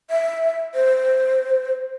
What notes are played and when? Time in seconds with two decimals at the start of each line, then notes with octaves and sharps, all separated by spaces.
0.10 E5
0.75 C5